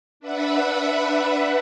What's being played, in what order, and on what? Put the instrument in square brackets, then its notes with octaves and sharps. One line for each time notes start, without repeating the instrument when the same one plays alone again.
[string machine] D4 B4 E5 F#5 B5